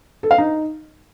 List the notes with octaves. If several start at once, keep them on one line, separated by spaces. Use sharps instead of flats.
A4
F5
D#4